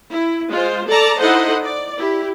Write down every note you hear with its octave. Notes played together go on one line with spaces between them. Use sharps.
E4
G#3 F4 C5
A4 D5 A5 A#5
D#4 E4 A4 C5 D#5 F#5
D5
E4 G4